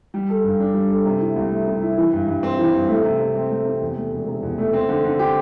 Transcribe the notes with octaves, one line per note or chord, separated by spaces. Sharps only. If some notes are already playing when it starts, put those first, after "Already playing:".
G3
A4
G2
D4
G3
A4
C3
E4
C2
A3
C3
E4
E3
G2
G2
C4
E3
G2
A3
C3
C3
C4
A3
C3
E2
A3
E1
C3
E2
A3
C4
D3
D3
G4